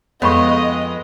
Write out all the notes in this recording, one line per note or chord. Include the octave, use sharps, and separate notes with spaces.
F2 G#3 B3 C#5 D#5 B5 C#6